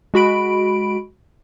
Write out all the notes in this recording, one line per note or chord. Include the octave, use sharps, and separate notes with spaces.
G#3 F#4 B5 D7